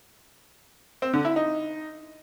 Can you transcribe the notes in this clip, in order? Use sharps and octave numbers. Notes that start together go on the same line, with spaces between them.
C4
D3
E4
D#4